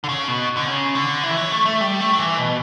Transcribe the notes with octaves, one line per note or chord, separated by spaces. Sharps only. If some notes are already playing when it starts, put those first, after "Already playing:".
D3
C#3
B2
D3
C#3
D3
E3
F#3
A3
A3
G3
A3
F#3
E3
B2